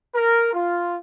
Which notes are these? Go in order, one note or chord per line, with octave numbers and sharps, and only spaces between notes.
A#4
F4